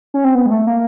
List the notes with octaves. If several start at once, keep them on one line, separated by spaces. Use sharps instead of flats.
C#4
C4
B3
G#3
A3
A#3